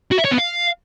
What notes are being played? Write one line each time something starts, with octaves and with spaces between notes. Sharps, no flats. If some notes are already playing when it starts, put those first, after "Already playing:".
F#4
E5
C#5
B3
F5